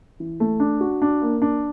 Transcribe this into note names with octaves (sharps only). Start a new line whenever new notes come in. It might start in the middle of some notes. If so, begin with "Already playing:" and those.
E3
A3
D4
F#4
D4
A#3
D4